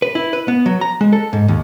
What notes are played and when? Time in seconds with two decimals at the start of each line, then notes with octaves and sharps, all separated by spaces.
0.02 B4
0.15 E4
0.33 B4
0.48 B3
0.66 F#3
0.81 A#5
1.01 G#3
1.13 A4
1.33 G#2
1.48 D#2